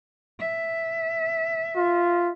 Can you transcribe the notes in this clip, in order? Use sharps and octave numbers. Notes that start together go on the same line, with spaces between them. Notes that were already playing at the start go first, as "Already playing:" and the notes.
E5
F4